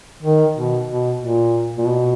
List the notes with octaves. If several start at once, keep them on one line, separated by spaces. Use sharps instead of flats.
D#3
B2
B2
A#2
A#2
B2